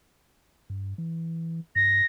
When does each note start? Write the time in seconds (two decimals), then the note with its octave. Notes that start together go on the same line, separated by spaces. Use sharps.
0.70 G2
0.98 E3
1.76 G2 A#6